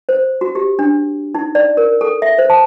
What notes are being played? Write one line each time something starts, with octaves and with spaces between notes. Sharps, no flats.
C5
F#4
G4
D4
D#4
D5
A#4
A4
E5
C5
A5